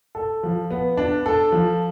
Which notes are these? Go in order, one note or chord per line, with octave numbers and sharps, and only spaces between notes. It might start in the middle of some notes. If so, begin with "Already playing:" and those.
A4
F3
B3
D4
A4
F3